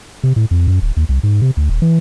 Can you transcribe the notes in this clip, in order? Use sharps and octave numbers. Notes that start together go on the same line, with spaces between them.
C3
A2
F2
F#2
D1
D#2
C2
G#2
C3
D2
D#1
E3